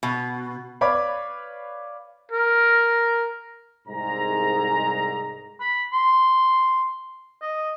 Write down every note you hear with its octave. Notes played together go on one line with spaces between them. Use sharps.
B2
B4 C#5 D5 F5 B5 D6
A#4
C2 G#2 A#5
B5
C6
D#5